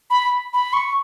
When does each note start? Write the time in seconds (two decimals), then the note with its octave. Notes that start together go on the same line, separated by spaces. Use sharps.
0.10 B5
0.53 B5
0.73 C#6